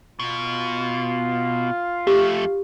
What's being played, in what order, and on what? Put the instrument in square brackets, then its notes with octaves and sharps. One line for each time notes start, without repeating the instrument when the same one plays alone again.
[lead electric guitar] B2 [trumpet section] F4
[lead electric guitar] F2 A3 [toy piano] G4